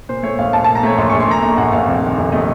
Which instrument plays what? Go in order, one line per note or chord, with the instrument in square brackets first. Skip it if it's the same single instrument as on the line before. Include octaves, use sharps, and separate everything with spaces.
[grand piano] A#2 C5
A3 C#5
A#1 F5
A#1 A5
A#2 A5
A#5
A3 C#5
A#1 C6
A#1 C#6
C6
A#2 A#5
A3 A#5
A#1 F#5
A#1 F5
F2
D#3
F1
A3 D#5